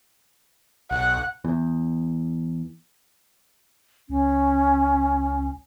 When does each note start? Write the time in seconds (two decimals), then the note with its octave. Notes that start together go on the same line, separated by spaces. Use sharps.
0.91 B1 F#5
1.45 E2
4.09 C#2 C#4